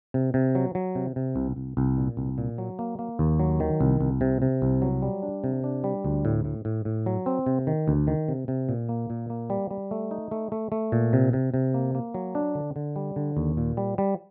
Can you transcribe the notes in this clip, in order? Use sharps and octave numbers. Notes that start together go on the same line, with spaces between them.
C3
C3
F#3
F#3
C3
C3
C2
C2
C2
A#2
C2
A#2
F#3
A#3
A#3
D#2
F#3
D#3
C2
C2
C3
C3
C2
F#3
G3
D4
C3
D4
G3
D2
A2
A2
A2
A2
F#3
C4
C3
D#3
D2
D#3
C3
C3
A#2
A#3
A#2
A#3
G3
G3
A3
D#4
A3
A3
A3
A#2
C3
C3
C3
A#3
A#3
F#3
D4
D3
D3
G3
D3
D#2
A#2
G3
G3